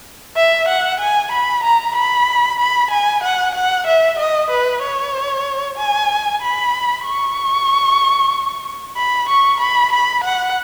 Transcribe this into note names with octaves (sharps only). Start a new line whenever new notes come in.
E5
F#5
G#5
B5
A#5
B5
B5
G#5
F#5
F#5
E5
D#5
B4
C#5
G#5
B5
C#6
B5
C#6
B5
B5
F#5